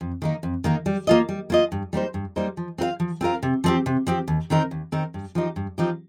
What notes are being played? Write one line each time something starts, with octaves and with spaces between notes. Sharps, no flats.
F2
D#3 A#3 D#4
F2
D#3 A#3 D#4
G3
A#3 F4 D#5
G3
A#3 F4 D#5
G2
G3 A#3 D#4 C5
G2
G3 A#3 D#4 C5
F3
C4 F4 A#4 F5
F3
C4 F4 A#4 F5
C3
F3 C4 G4
C3
F3 C4 G4
D#2
D#3 C4 D#4 A#4
D#2
D#3 C4 D#4 A#4
G2
F3 C4 D#4 G4
G2
F3 C4 D#4 G4